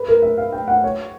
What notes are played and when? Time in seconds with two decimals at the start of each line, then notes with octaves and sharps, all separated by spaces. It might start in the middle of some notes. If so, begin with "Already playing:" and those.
Already playing: B4
0.08 A#4
0.22 E5
0.38 F5
0.52 G5
0.68 F#5
0.84 C#5